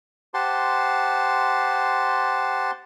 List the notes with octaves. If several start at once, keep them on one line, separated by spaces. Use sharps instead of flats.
G4 C5 F#5 A5 C6